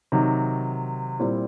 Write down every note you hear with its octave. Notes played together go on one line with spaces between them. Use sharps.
C3 D#3 F#3
A#2 G3 C4 E4